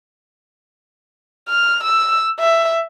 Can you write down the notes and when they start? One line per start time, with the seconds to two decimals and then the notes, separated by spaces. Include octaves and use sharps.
1.49 F6
1.84 E6
2.40 E5